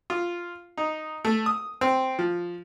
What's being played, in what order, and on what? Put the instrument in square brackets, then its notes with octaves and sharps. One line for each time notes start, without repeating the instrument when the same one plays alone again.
[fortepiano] F4
D#4
A3
D#6
C4
F3